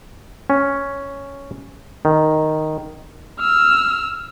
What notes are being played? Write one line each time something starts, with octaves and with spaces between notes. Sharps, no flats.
C#4
D#3
E6 F6